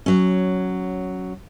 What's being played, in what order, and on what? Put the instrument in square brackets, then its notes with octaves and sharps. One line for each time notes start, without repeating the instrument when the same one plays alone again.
[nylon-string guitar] F#3 C#4